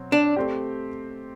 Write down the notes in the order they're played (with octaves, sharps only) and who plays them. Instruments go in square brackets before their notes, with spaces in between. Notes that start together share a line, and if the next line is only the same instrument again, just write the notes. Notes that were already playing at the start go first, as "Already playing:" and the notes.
Already playing: [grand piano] B2 F#3 C4
[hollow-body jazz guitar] D4
[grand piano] A3 C4 G4